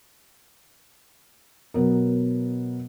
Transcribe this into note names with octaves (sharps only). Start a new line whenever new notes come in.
B2 F#3 B3 A#4